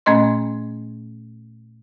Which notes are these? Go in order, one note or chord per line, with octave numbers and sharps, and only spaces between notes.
A#2 A3 C#4 D#5 C6